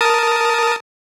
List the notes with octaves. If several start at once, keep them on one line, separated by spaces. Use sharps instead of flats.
A#4 A5 D#6